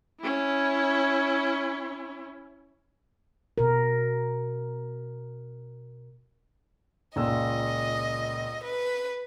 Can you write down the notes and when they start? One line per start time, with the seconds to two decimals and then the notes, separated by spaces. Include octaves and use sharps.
0.20 C#4 E4
3.58 B2 A#4
7.16 C#2 A#2 D#5 E6
8.64 B4